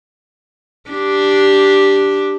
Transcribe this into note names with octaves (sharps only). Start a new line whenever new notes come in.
D4 G4